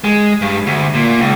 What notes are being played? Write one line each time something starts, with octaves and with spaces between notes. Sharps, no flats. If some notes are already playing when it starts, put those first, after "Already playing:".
G#3
G2
D2
A#2
C#2